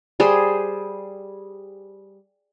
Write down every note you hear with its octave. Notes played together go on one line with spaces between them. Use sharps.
G3 G#4 C5